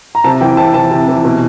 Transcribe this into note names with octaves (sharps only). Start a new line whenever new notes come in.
A#5
C3 A5
E3 G5
C3 A5
E3 A5
C3
E3
B2